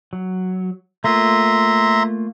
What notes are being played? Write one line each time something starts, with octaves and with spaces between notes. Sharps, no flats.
F#3
A3 A#3 F4 E5 A#5 C6